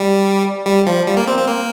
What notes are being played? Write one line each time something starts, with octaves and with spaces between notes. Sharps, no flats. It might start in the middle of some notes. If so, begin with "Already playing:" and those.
Already playing: G3
G3
F3
G3
A#3
C4
C4
A#3